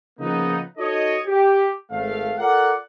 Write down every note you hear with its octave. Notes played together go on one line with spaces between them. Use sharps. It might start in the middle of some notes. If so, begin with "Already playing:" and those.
C#3 F3 A#3 B3 D#4
D#4 F#4 A4 C#5 D#5
G4
G#1 A3 F5
F4 A4 A#4 D5 F#5